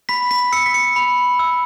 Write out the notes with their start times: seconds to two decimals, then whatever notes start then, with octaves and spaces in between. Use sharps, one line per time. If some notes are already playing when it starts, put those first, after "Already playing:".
0.09 B5 B6
0.31 B6
0.52 E6 C#7
0.66 B6
0.74 C#7
0.96 B5
1.39 E6